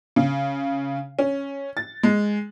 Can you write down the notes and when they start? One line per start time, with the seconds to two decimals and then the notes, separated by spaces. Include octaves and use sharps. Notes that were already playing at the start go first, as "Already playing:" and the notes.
0.16 C#3
1.19 C#4
1.77 A6
2.03 G#3